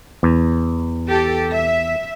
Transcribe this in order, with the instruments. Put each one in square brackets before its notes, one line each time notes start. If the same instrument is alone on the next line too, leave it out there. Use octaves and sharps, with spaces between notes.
[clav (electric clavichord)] E2
[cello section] G4 A4
E5